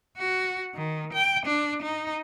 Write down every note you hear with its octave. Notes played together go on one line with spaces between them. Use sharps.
F#4
D#3
G5
D4
D#4